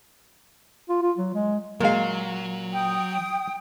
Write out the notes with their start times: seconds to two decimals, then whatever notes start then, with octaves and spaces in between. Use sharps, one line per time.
0.89 F4
1.02 F4
1.18 F#3
1.35 G#3
1.80 A#2 F#3 G#3 A#3 F5
2.73 G5 D#6